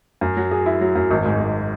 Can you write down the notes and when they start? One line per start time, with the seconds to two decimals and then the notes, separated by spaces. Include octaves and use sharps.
0.21 F#2
0.37 F#3
0.51 G#4
0.66 E4
0.81 F#3
0.95 F#2
1.11 G#1
1.25 G#2
1.40 G#1